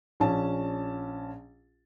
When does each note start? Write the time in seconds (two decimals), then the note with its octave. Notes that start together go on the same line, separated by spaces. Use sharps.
0.20 A#1 C#4 A5